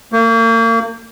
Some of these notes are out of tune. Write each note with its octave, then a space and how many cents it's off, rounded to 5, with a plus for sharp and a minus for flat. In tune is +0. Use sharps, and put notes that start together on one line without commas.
A#3 -40